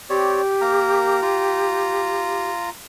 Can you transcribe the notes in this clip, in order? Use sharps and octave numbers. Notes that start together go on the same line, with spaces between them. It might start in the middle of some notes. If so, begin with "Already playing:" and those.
C4 G4 C#5 D5
A#3 A#4 A#5
F4 A#5